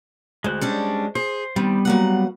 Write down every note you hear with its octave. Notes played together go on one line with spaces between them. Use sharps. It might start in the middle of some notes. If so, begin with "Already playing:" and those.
D2 G#3 C5 F#6
G3 C#4 D4
G#4 C5
D#3 G3 B3 C4
F#3 A#3 F#5